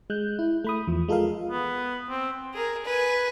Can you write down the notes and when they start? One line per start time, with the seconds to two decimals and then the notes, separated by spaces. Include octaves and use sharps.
0.10 G#3 F#6 G6
0.39 E4
0.64 A3 B5 D#6
0.87 E2 F3
1.08 G#3 F4 A4 A#4 F5
1.49 B3
2.10 C4
2.54 G#4 A#4
2.85 B4 G#5